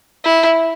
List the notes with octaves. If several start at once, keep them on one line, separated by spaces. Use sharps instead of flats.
E4